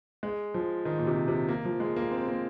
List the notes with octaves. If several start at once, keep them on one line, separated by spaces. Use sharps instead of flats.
G#3
F3
D#3
A#2
C3
C3
A#3
F3
G#3
A#3
C4
A#3